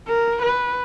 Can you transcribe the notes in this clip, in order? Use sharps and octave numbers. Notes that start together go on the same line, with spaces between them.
A#4
B4